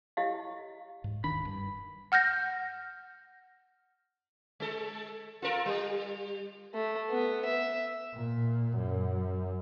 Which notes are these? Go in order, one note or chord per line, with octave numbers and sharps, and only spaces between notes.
E4 G4 C#5 D#5 F5
G#2
D#1 D#3 D4 B5
G2
F#5 F6 G6 A#6
G#3 A4
F4 A4 A#4
G3
A3
B3
E5
A#2
F#2